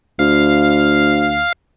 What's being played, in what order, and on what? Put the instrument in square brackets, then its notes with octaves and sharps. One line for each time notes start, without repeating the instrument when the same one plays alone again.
[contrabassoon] D2 [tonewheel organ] F5